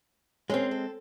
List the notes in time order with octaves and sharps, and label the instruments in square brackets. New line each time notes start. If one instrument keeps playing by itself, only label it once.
[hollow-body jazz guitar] G#3 C4 [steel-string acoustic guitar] C#4 G#4 A#4
[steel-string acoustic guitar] A4